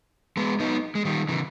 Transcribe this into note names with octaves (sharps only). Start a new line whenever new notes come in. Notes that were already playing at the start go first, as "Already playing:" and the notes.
G#3 B3
B3 D#4
G#3
D#3 G3
C#3 E3